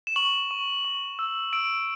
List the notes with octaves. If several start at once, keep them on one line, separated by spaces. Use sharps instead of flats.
E7
C#6 F#7
C#6
C#6
E6
E6 D7